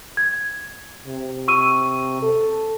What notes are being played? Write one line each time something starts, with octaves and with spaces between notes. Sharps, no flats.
G#6
C3
C#6 E6 D#7
A4